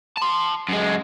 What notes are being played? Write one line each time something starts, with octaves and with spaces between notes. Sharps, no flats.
A5 C6
F#2 G#3